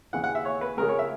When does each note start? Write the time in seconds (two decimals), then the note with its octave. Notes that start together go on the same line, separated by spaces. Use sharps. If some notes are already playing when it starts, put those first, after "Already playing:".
0.13 D#2 C#3 E3 F#5
0.24 F#5
0.35 E5
0.45 C#5
0.61 B4
0.77 C#2 C#3 G#3 A#4
0.89 C#5
0.99 E5